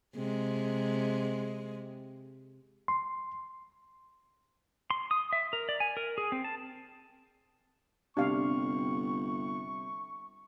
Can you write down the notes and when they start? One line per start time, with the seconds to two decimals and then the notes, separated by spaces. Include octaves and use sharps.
0.15 C3 G#3
2.88 C6
4.91 C6
5.11 D#6
5.33 E5
5.53 A#4
5.69 D5
5.80 G#5
5.97 A#4
6.18 G#4
6.32 C4
6.44 A5
8.17 G1 C3 D4 G4 F5 C#6